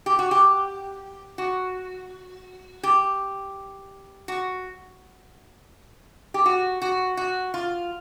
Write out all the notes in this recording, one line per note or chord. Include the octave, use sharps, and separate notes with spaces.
G4
F#4
G4
F#4
G4
F#4
G4
F#4
F#4
F#4
F4